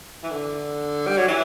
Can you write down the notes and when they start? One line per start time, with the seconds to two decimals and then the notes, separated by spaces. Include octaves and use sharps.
0.24 E3
0.31 D3
1.07 G3
1.18 F#3
1.28 E3